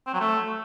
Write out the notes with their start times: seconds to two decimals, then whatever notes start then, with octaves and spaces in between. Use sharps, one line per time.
0.07 C4
0.14 F#3
0.20 A3